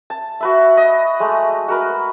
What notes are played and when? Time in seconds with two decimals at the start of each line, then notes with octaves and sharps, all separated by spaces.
0.10 A5
0.40 F#4 B4 E5
0.77 D#5
1.20 G#3 A3
1.68 F#4 A#4 B4